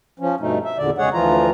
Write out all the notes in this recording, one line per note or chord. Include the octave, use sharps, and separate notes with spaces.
F3 C#4
G2 B2 A3 D#4
E5
E2 A#2 D3 D5
E2 C#3 G#3 G#4 C#5 F#5
D2 E3 F3 F4 A#5